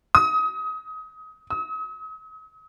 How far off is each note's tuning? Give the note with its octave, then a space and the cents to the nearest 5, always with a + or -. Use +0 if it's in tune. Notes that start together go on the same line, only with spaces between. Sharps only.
D#6 +30
D#6 +45